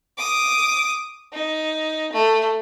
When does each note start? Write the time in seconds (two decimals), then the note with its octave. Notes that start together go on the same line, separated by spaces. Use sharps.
0.18 D6 D#6
1.33 D#4
2.13 A3